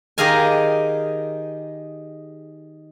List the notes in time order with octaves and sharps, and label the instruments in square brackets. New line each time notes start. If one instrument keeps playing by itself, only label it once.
[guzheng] D#3 G4 G#4 D#5 F5 G#5